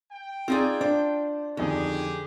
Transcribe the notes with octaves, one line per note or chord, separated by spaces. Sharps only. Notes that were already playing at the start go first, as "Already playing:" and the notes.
G5
C4 D#4 F4 G#4 D5
D4 C5
F2 D3 D#3 G4 G#4